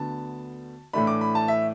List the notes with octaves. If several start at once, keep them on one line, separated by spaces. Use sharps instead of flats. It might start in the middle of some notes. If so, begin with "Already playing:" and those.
Already playing: D2 D3 B3 A5
A2 E3 A3 D4 B5
D6
B5
A5
E5